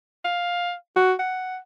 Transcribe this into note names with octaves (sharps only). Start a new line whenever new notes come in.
F5
F#4
F#5